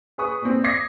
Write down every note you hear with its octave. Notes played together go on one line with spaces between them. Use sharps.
G#4 B4 C#6 D#6
A#2 C4
D6 D#6 G#6 A#6 C7